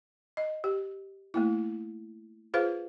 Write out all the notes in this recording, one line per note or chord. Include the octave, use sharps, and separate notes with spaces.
D#5
G4
A3 A#3 E4
F4 G#4 B4 C5 F5